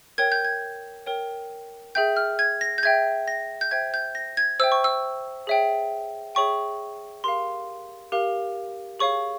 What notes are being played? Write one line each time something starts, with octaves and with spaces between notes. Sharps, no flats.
A#4 C#5 G5 G#6
G6
G#6
A#4 C#5 G5
G#4 E5 G5 G6
F6
G#6
A#6
G6
G#4 E5 G5 G#6
A#6
G6
C5 E5 G5 G#6
G6
A#6
G#6
C5 E5 G5 E6
C#6
E6
G#4 C#5 E5 G5
G#4 C#5 E5 G5 C#6
G4 A#4 F5 C6
G4 A#4 F5
G#4 C#5 F5 C#6